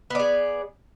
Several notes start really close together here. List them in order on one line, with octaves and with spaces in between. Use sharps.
B3 D5 G#4